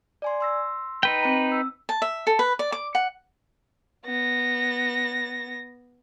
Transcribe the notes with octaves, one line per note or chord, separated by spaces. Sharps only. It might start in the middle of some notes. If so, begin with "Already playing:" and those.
D5 G#5 C6
C6 E6 A#6
D#4 B4 G5
C4 A#5
E6
A5
E5
A4
B4
D5
D6
F#5
B3 A#6